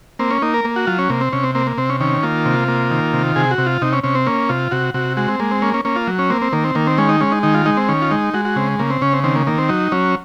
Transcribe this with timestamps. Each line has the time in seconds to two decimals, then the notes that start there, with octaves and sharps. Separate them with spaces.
0.19 A#3 C4
0.31 C#4
0.42 A#3 D#4
0.54 A#4
0.65 A#3
0.76 F#4
0.87 F#3 F4
0.99 C#4
1.10 C3 A#3
1.21 C4
1.33 C3 C#4
1.43 C4
1.55 A#3 C4
1.67 A#3
1.78 C3 C4
1.90 C#4
2.00 D#3 C#4
2.23 A#3 F4
2.46 C3
2.68 A#3
2.91 D#3
3.13 C3
3.36 C3 G#4
3.51 F#4
3.58 C3
3.67 F4
3.82 C3 D#4
3.93 C#4
4.03 C3 C#4
4.15 C4
4.27 A#3 C#4
4.49 C3 F4
4.71 C3 F#4
4.94 C3 F#4
5.17 G#3 F#4
5.28 C4
5.40 G#3 A#3
5.51 C4
5.62 A#3 C#4
5.74 C#4
5.85 A#3 C#4
5.96 F4
6.07 F#3
6.19 C#4
6.30 A#3 C4
6.42 C4
6.53 D#3 A#3
6.64 C4
6.75 D#3 A#3
6.87 C4
6.98 G#3 C#4
7.09 D#4
7.20 G#3 C#4
7.32 D#4
7.43 D#3 D#4
7.54 F4
7.66 G#3 D#4
7.77 C4
7.88 D#3 C#4
8.02 F4
8.11 G#3 D#4
8.34 G#3 F#4
8.45 F#4
8.56 C#3 C4
8.79 C#3 A#3
8.90 C4
9.01 C#3 C#4
9.13 C4
9.24 D#3 C4
9.35 A#3
9.47 D#3 A#3
9.58 C4
9.69 F#3 D#4
9.92 F#3 C#4